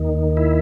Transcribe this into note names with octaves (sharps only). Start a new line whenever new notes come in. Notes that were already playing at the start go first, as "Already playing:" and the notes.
Already playing: D#2 D#3
E4